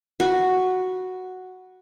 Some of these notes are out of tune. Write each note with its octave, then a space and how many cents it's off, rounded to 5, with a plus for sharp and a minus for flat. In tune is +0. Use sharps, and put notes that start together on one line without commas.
F#4 +0 B4 -20